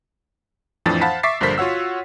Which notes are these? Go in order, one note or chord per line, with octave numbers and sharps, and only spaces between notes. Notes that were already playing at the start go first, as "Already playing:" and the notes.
F2 A2 E3 F3 D4 A6
C5 F5 F#5 A5 B5 B6
E5 C#6 D6 A6 B6 C7
A#1 G2 D3 A#4 C5 B6
F4 F#4 C#5 F#5 E6